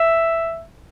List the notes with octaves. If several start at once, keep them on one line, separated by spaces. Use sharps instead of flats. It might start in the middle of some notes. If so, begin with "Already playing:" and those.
Already playing: E5